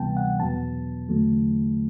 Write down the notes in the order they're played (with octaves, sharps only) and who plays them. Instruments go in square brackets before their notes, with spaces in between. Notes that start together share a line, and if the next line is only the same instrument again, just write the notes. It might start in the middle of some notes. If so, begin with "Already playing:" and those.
Already playing: [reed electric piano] D2 C3 E3 G3 B3 G5 A5
F#5
E2 B2 F#3 B3 A5
E2 D3 F#3 A3